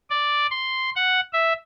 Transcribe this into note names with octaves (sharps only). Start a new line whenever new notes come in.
D5
C6
F#5
E5